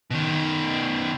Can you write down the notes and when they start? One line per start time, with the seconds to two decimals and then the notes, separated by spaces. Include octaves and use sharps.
0.11 B2 D#3